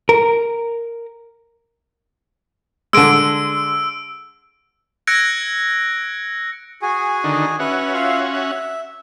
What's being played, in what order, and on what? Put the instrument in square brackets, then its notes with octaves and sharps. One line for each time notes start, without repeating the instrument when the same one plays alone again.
[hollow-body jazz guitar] A#4
[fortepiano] D3 G#3 [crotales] E6 D7
[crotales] E6 F#6 G#6 A#6 C#7 D7
[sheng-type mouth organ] F#4 G#4 G#5
[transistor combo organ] D3 D#3
[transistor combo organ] C#4 F#4 [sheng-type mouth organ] B4 E5
[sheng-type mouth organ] F4 E5 F5
E5